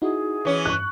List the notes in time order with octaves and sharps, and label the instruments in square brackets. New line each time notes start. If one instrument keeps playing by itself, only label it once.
[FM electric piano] D#4 E4 F#4 [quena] G#4
[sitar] E3 C#4
[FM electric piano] G2 [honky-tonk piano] C#6 F#6